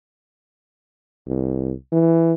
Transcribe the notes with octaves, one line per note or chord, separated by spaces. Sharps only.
C2
E3